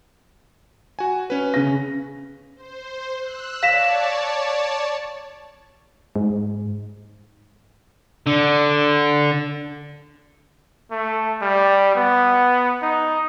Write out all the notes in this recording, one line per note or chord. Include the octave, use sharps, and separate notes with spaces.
F#4 G#5
C#4 B4
C#3 A#6
C5
E6 F#6
C#5 D5 F5 A5 B6 E7
G#2
D3
A3
G3
B3
D#4